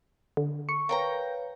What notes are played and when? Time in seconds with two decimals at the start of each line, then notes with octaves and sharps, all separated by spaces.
0.37 D3
0.69 C#6 C#7
0.89 A#4 B4 C#5 F5 G5 A#5